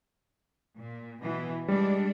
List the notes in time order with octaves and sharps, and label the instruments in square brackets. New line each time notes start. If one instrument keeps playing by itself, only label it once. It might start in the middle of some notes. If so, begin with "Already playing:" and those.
[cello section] A#2
B2 E3
[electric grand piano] G3 [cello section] G#3 D4